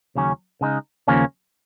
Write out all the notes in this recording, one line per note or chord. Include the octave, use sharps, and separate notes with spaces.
D#2 C#3 F#3 C#4
C#3 G#3 D#4
D#2 C#3 F3 A#3 C#4